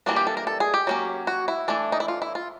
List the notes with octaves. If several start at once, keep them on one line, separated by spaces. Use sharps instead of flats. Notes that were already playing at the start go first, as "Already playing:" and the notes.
E3 G3 A#3 D4 F#4
G4
A4
A#4
A4
G#4
G4
F#3 A#3 C#4
F#4
E4
E3 A3 D4
D#4
E4
F4
E4
F4